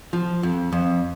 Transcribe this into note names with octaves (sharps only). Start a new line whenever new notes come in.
F3
F2
F2